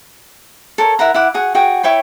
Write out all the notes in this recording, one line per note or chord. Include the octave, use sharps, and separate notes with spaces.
A4 A#4 C#5
E4 A#4 F#5 A#5
E4 F#5 D6
F#4 G#4 F#5
F#4 G#4 G5
E4 C#5 G5 B5